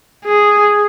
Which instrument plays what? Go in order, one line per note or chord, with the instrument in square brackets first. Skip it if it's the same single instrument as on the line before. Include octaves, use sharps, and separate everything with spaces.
[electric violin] G#4